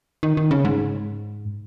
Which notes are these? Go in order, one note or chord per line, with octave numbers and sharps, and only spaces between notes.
D#3
D#3
C#3
G#2